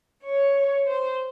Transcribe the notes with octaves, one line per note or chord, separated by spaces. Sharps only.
C#5
C5